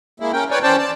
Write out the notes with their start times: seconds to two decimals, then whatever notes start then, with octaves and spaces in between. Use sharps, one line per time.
0.20 G#3 A#3 E4
0.33 C#4 A#4 G5
0.51 B4 C#5 D5 G5 G#5
0.63 E2 C#4 C5 D5 G5 A5
0.78 D5 A5